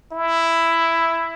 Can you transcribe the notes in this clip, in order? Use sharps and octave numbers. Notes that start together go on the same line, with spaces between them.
E4